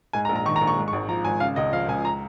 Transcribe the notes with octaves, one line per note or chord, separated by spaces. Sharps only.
G#2 G#5
A#5
A#1
A#5
D#3 C#6
A#5
A#1
C#6
G#2
C#6
G#1
F3 A#5
G#1 G#5
C#3 F5
C#2 D#5
F3 F5
C#2 G#5
A#5